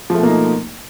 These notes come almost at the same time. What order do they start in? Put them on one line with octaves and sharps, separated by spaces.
F3 A3 B2 A#3 D#4